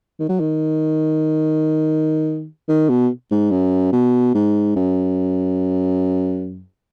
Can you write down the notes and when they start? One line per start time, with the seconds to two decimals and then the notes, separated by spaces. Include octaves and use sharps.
0.19 D#3
0.29 F#3
0.40 D#3
2.69 D#3
2.89 B2
3.31 G#2
3.51 F#2
3.93 B2
4.35 G#2
4.76 F#2